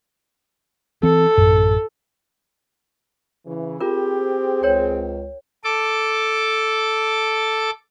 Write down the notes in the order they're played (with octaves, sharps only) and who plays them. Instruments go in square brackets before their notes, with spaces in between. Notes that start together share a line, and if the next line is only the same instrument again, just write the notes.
[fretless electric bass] E3 C4 [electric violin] A4
[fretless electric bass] A1 F#2
[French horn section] C#3 E3
[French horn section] C4 G#4 [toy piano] F4 A#4 [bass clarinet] G4
[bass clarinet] C#2 [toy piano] A#4 C#5 G5
[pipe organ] A4 D6